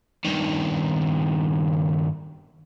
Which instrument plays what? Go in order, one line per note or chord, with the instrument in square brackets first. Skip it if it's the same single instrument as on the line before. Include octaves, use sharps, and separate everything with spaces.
[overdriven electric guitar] G2 D#3